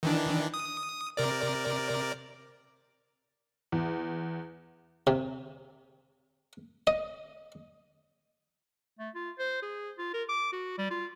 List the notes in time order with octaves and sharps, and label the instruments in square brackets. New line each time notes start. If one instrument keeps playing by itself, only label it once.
[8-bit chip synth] D#3 E3 D4
D#6
C3 A#4 D5
[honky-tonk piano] E2
[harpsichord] C3
D#5
[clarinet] A3
F4
C5
G#4
F4
A#4
D6
F#4
G3
F4